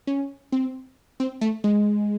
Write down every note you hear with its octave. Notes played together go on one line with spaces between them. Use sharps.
C#4
C4
C4
A3
G#3